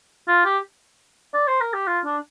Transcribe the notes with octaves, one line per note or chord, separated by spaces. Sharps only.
F4
G4
D5
C5
A#4
G4
F4
D4